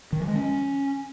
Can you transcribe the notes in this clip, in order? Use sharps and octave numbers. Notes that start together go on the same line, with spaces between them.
D#3
F3
G#3
C#4